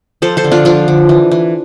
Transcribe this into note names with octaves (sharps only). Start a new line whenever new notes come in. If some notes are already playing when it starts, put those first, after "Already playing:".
F3 A4 C5
A4 C5
D3
D4 F4
F3 D4 F4
D3
E3
E3